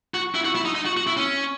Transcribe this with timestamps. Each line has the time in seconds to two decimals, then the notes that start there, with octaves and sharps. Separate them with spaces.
0.14 F#4
0.35 E4
0.45 F#4
0.55 E4
0.65 D#4
0.75 D#4
0.86 F#4
0.97 F#4
1.07 E4
1.17 C#4